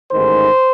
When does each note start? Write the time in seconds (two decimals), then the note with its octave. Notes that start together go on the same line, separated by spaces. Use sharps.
0.11 A1 G#2 D#3 C5